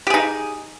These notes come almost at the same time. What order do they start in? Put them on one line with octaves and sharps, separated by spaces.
G4 G#4 D#4